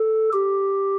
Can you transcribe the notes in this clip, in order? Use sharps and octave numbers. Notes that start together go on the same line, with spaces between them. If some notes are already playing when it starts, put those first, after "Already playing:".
Already playing: A4
G4